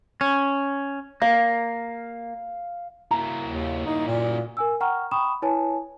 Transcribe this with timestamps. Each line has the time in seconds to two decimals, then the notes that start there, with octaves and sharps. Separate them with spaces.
0.21 C#4
1.22 A#3 F5
3.11 A#3 E4 A#5
3.48 D#2
3.86 D#4
4.07 A#2
4.57 A#4 G#5 E6
4.80 F#5 G5 A#5 C#6 F6
5.11 G5 B5 C#6 D#6 E7
5.42 E4 B4 C#5 G#5 A5